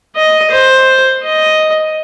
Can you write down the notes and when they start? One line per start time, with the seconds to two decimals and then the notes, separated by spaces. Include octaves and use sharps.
0.16 D#5
0.51 C5
1.22 D#5